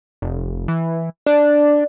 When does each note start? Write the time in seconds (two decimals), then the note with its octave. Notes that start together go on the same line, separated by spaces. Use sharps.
0.22 F1
0.68 E3
1.26 D4 D5